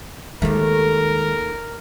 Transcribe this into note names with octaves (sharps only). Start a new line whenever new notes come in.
D#2 D#3 G#3 A3 A#4